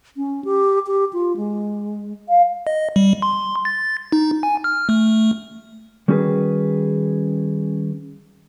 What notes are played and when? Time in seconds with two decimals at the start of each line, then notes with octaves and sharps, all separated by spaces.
0.17 C#4
0.44 G4
0.87 G4
1.13 F4
1.37 G#3
2.29 F5
2.67 D#5
2.96 G3
3.22 C6
3.65 A6
4.12 D#4
4.43 G#5
4.64 F6
4.89 A3
6.08 D#3 G3 C#4 F#4 G#4 B4